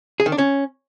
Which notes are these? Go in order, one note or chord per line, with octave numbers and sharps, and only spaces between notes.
G#4
D#3
D4
C#4